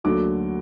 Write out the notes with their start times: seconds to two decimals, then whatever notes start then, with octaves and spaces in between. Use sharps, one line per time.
0.04 D2 D3 F#3 A#3 D4 D6